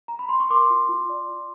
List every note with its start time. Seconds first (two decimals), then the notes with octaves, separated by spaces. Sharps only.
0.08 A#5
0.19 B5
0.29 C6
0.40 C#6
0.50 A#4 C6 D6
0.70 F4
0.89 F4
1.09 D5
1.29 F4